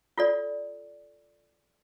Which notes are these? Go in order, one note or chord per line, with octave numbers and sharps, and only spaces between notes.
F4 A4 D5